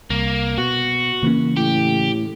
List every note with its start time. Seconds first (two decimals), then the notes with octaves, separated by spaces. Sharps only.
0.10 C2 A#3
0.58 B2 F#4
1.23 C#3 E3 A#3 C#4
1.57 A2 G4